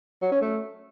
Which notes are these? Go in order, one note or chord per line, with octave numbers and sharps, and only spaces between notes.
F#3
C#4
A3